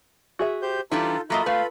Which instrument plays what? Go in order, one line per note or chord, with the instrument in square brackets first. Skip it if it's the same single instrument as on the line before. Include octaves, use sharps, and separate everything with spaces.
[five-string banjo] F#4 G#4 E5
[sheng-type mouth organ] G4 C5 G6
[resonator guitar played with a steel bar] E3 G3 D4 [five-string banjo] D#4 [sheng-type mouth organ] F4 A4 [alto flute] A#5
[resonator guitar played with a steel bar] F#3 A#3 D#5 [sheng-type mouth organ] F4 A4 B5 [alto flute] E5
[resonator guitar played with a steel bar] A3 [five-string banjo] B4 [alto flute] F5